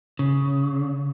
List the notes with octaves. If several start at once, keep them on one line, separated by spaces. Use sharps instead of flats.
C#3